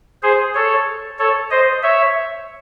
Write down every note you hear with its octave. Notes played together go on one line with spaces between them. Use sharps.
G#4 C5
A4 C#5
A4 C#5
C5 D#5
C#5 E5